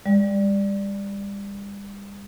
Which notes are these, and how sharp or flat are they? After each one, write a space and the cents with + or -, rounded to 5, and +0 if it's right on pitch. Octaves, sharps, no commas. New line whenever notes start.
G3 +40 D5 +0